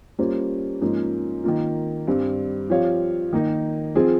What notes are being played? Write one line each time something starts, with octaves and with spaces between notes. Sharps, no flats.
G3 A#3 C#4 F4 C5
G#2 F3 A#3 C#4
D#3 A#3 F4
G2 G3 C4
F3 C4 G4 C#5 F5
D#3 A#3 D#4
F3 C4 F4 G#4